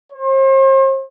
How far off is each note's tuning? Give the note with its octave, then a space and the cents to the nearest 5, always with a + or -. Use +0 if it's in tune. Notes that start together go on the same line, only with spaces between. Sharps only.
C5 +40